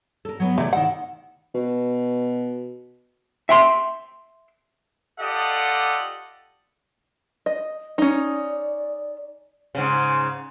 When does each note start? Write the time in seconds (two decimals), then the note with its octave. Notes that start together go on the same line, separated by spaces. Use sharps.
0.25 A4 A#4
0.40 F#3 B3
0.58 C3 E3 A3 G#4 D5
0.73 D#3 D#4 E4 F#5
1.55 B2
3.49 E5 G5 C6
5.19 F4 G4 A4 D5 D#5 F#5
7.46 D#5
7.98 C#4 D#4 D5
9.75 G#2 C#3